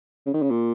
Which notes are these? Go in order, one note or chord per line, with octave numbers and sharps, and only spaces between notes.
C#3
D#3
C#3
A#2